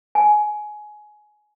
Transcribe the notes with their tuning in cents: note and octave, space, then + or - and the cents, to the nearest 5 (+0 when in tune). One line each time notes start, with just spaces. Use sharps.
G#5 +20